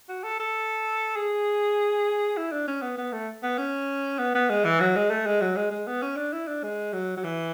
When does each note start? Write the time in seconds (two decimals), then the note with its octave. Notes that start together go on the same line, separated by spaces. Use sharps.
0.09 F#4
0.24 A4
0.40 A4
1.16 G#4
2.37 E4
2.52 D4
2.68 C#4
2.82 B3
2.98 B3
3.12 A3
3.43 B3
3.58 C#4
4.19 B3
4.35 B3
4.50 G#3
4.65 E3
4.80 F#3
4.96 G#3
5.11 A3
5.27 G#3
5.41 F#3
5.57 G#3
5.71 G#3
5.87 B3
6.02 C#4
6.17 D4
6.33 E4
6.48 D4
6.63 G#3
6.93 F#3
7.17 F#3
7.24 E3